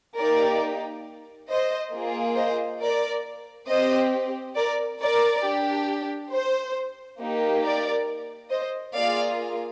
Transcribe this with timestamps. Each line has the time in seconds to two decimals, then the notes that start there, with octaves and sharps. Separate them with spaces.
0.18 A#3 D#4 G4 A#4 D5
1.50 C5 D#5
1.94 A#3 F4 G#4
2.37 C5 D#5
2.82 A#4 D5
3.69 C4 G4 C5 D#5
4.56 A#4 D5
5.00 A#4 D5
5.44 D4 G4
6.32 C5
7.20 A#3 D#4 G4
7.64 A#4 D5
8.50 C5 D#5
8.94 A#3 F4 G#4 D5 F5